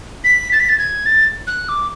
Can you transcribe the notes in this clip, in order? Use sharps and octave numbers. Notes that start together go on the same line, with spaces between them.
B6
A6
B6
A6
G#6
A6
F#6
D6